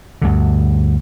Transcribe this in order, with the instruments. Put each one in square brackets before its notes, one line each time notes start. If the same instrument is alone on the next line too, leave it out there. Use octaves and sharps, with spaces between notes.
[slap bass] D2 G2 D3